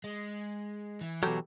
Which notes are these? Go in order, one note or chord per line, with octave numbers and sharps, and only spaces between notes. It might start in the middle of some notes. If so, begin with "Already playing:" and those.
G#3
E3
B2 F#3 G4 A4